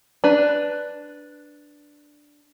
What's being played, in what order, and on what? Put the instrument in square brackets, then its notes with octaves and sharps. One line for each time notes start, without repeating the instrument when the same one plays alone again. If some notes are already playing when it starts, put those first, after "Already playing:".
[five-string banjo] D4 B4